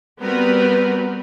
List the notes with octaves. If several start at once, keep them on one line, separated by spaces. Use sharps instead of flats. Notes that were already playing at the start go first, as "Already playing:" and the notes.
G3 B3 C4 F#4 A#4 B4